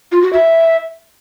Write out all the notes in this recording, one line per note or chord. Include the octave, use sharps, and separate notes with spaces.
F4
F#4
E5